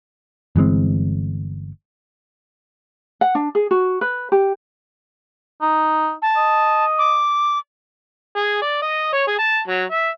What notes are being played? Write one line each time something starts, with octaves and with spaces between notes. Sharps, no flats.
G1 E3 G#3 C4
F#5
D4
G#4
F#4
B4
G4
D#4
A5
D#5
D6
G#4
D5
D#5
C#5
G#4
A5
F#3
E5